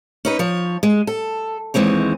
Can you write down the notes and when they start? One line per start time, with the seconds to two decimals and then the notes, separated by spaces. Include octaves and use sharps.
0.25 C#4 D#4 B4
0.39 F3 C#5
0.83 G#3
1.07 A4
1.74 D#2 E3 G#3 C4 C#5